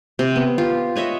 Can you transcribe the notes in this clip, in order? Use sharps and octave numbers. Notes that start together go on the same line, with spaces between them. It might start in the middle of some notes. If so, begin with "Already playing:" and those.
C3 C6
B3
F4 G4
B4 C#5 D#5 E5